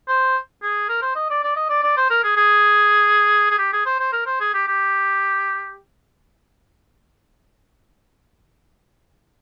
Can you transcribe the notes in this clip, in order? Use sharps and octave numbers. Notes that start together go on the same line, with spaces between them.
C5
G#4
A#4
C5
D#5
D5
D5
D#5
D5
D5
C5
A#4
G#4
G#4
G#4
G4
G#4
C5
C5
A#4
C5
G#4
G4
G4